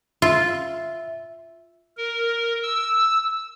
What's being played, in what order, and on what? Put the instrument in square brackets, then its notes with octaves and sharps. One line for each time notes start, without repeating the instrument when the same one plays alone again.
[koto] F4 [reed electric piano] E5
[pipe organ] A#4
E6